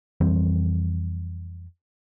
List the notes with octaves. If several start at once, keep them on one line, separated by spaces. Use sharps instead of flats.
F2 E3 G3 C4